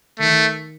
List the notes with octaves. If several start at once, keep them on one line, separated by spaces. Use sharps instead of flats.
D#3 A3